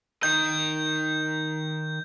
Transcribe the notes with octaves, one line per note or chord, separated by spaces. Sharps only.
D#3 D#5 G6